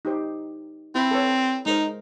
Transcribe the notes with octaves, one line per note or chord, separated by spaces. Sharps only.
D#4 G4 C5
C4 E4 B5
A4 B4 C#5
G#3 D#4 A#4 C5